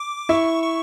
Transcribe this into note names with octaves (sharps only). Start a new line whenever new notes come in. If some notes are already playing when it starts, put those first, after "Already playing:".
Already playing: D6
E4 C#6
C#6